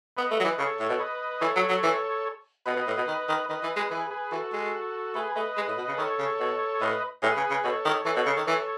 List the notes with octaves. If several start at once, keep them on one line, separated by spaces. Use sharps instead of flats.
B3 B4 D#5
A3
F#3
E3
C#3 A4 C#5
A2
B2
B4 D#5
E3 A4 C#5
F#3
F#3
E3
B2 B4 D#5
B2
A2
B2
D#3
D#3
D#3 B4 D#5
E3
G#3
E3 G#4 B4
G#4 B4
E3 F#4 A4
G#3
A3 G#4 B4
A3 B4 D#5
G#3
A2
B2
C#3
D#3 A4 C#5
C#3
B2
A2 B4 D#5
A2 G#4 B4
C#3
C#3
B2 A4 C#5
D#3
E3 A4 C#5
B2
C#3
D#3
E3 A4 C#5